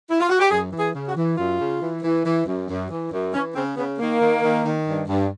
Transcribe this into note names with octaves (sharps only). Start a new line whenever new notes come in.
E4
F4
F#4
G4
F#2 G#4
E3
G#4
C#3
F#4
E3
F#2 F4
C#3
E3
E3
E3
F#2
F#2
E3
F#2
E3 C#4
C#3 C4
C#3 B3
D#3 A#3
D#3
D#3
D#3
G2
G2